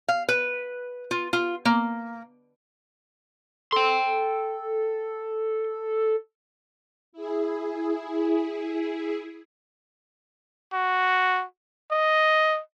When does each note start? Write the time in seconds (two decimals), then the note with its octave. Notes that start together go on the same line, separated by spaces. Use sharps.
0.08 F5
0.28 B4
1.11 F4
1.33 F4
1.65 A#3
3.72 A4 G5 C6
7.13 E4 G#4
10.73 F#4
11.91 D#5